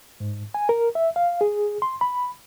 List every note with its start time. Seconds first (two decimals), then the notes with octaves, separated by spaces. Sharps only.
0.20 G#2
0.54 G#5
0.69 A#4
0.95 E5
1.16 F5
1.41 G#4
1.82 C6
2.01 B5